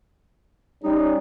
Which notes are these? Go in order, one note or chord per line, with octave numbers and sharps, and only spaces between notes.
G3 C#4 D#4